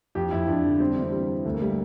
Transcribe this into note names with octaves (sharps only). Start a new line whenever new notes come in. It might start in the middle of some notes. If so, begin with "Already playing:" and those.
F2 G4
F2 E4
F2 D4
D3
G3 C4
D4
E3
C4
G3
E3
D2 A3
A#3
G3 A3